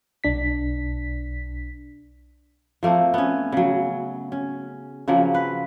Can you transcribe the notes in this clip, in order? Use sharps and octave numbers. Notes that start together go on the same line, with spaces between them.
B1 D4 B6
F3 A3 A#3 C4
B3 C#4
C#3 F#3
C#4
C#3 F3 F#3 A#3
B4